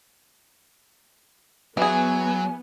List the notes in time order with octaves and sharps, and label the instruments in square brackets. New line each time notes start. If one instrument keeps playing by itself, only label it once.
[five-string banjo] E3 G#4 [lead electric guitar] F#3 [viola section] B3 [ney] G#5